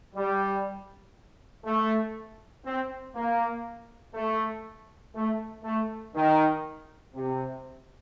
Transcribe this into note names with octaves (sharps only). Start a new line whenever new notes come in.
G3
A3
C4
A#3
A3
A3
A3
D#3
C3